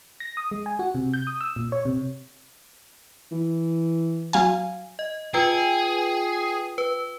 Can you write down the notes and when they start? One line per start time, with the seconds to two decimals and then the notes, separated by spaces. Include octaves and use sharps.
0.20 A#6
0.37 D#6
0.51 G#3
0.66 G#5
0.79 F#4
0.95 C3
1.14 G6
1.27 D#6
1.41 E6
1.56 A#2
1.72 C#5
1.85 C3
3.32 E3
4.33 F#3 F5 G#5
4.99 D#5
5.34 F4 G#4 B4 G5
6.78 B4